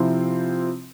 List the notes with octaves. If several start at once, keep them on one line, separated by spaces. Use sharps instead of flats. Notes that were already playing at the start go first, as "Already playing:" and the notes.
Already playing: C3 F3 C4 E4